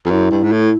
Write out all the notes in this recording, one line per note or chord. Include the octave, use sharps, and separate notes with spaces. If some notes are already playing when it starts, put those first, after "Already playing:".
F2
F#2 E4
G2
G#2
A2